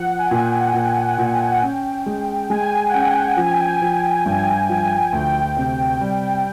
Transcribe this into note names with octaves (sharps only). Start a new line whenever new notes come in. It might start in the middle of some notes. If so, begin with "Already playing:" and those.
Already playing: F3 F#5
G#5
A#2 G5
A#2
A#2
C#4
G#3
G#3 G#5
F#5
C#4 G5
F3 G#5
G5
G#5
F3
G2 G#5
F3 G#5
D2 G5
C3
G3